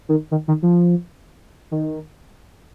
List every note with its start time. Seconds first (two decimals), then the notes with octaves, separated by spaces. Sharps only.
0.09 D#3
0.31 D#3
0.48 D#3
0.63 F3
1.71 D#3